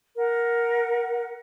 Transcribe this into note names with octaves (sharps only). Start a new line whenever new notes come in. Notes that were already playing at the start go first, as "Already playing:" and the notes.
A#4 F#5